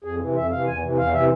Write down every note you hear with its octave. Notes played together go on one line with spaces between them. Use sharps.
F2 G#4
C3 E3
F2 E5
C3 E3 F5
E2 G#5
C3 E3
E2 F5
C3 E3 E5